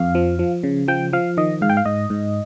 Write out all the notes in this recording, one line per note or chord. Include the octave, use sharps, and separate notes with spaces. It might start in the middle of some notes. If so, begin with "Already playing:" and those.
Already playing: F2 F5
F3
F3
C#3
F3 G5
F3 F5
D#3 D#5
G#2 F5
G5
F5
G#2 D#5
G#2